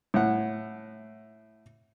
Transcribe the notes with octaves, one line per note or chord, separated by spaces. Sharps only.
A2 F#5